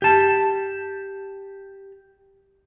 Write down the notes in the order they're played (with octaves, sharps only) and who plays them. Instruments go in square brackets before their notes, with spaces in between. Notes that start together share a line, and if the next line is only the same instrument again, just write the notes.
[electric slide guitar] G4 A5